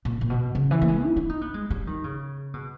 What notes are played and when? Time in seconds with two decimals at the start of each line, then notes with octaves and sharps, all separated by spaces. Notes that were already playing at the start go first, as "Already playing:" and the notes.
0.05 A#2
0.21 A#2
0.30 B2
0.55 C#3
0.71 E3
0.82 A#3
0.88 G#3
1.05 E4
1.16 E4
1.29 D#4
1.41 B3
1.54 G#3
1.70 G3
1.87 D#3
2.04 C#3
2.54 B2